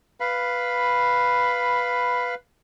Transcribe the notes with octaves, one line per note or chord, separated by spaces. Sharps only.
B4 F5 B5